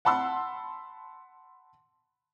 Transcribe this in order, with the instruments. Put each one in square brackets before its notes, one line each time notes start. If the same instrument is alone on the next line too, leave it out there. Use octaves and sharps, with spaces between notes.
[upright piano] F#5 A5 B5 C6 E6